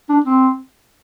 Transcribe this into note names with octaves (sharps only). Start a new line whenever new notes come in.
D4
C4